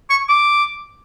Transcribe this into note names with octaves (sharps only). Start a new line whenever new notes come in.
C#6
D6